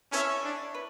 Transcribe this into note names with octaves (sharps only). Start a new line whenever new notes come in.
C#4 E4 A4 C#5 E5
D4
B4